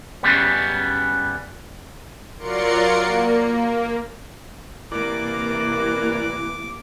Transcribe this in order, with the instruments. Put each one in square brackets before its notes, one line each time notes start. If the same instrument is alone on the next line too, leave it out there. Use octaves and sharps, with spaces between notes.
[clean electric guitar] F#2 C#3 G3 B3
[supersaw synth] F#3 F4 A#4 D5 C6 C#7
A#3
[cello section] C3 A#3 [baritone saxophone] E3 [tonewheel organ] A#4 D5 [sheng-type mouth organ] D6